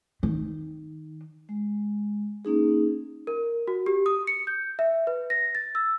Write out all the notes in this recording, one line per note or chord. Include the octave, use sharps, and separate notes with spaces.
D#3
G#3
A#3 C#4 D#4 G#4
A#4
F#4
G4
D#6
C#7
G6
E5
B4
A#6
A6
E6